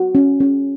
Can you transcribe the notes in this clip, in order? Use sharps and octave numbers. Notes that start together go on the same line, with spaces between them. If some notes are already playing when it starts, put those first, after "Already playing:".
Already playing: F#4
C#4
C#4